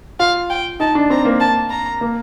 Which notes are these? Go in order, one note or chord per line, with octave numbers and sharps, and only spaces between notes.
F4 F5
G5
D#4 A5
D4
C4 A#5
A#3
A5
A#5
A#3